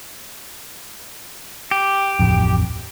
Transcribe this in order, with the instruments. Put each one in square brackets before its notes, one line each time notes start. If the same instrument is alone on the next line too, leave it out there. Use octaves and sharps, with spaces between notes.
[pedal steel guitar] G4
[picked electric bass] D1 A1 F2